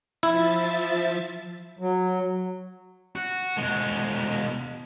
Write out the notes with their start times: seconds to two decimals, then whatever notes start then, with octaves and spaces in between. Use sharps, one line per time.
0.23 F3 E4 E5 A6
1.79 F#3
3.15 F#4
3.57 B2 G#3